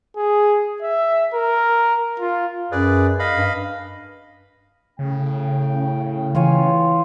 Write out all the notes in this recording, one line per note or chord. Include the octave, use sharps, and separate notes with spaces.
G#4
E5
A#4
F4
F#2 G#4 B4 D5
D#5 F5 B5
G2
A2 C#3 G5
E3 F4 C#5 G#5